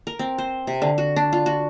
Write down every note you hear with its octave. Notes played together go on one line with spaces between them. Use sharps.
A#4
C4
C5
C3
D3
F#4
D4
F4
F#4